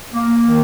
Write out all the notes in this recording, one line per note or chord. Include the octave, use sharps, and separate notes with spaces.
A#3
D#3